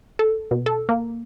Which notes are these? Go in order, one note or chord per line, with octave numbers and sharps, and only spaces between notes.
A4
B2
A4
A#3